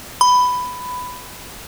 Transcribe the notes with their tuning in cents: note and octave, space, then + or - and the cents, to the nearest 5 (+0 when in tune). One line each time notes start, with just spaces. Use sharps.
B5 +10